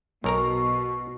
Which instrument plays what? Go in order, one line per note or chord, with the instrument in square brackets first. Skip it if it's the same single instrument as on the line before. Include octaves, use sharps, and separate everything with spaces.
[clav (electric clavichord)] B1 A#4 A#5 [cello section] B2 [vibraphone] C#6